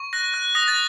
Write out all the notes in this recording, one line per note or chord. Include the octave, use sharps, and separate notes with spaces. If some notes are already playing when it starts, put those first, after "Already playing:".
Already playing: C#6
F#6 A#6
F#6
D#6 A#6
A6